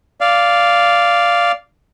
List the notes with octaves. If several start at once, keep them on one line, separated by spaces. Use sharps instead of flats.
D5 F5